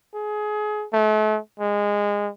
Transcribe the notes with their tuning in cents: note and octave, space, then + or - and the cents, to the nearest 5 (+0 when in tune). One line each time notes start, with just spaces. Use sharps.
G#4 +25
A3 -40
G#3 -20